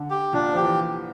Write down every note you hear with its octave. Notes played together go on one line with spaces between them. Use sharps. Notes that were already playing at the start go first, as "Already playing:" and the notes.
Already playing: D3
G4
A#2 D4
F3 G4
E3